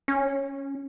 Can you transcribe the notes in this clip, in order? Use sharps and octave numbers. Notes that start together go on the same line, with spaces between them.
C#4